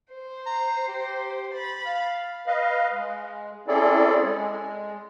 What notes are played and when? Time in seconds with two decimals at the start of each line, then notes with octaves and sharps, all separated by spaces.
0.12 C5
0.46 A#5
0.88 G4
1.53 B5 A6
1.86 F5
2.47 B4 D#5 F5
2.92 G#3
3.68 C4 C#4 E4 G#4 A4 D5
4.22 G#3